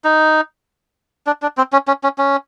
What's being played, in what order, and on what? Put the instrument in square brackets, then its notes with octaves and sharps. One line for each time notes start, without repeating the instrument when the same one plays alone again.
[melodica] D#4
D4
D4
C4
C#4
C#4
C#4
C#4